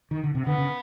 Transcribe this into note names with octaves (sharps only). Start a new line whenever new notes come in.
D#3
D3
C3
D3 B3
C#3